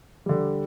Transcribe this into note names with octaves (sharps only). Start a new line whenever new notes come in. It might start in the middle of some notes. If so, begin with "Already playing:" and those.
D3 G3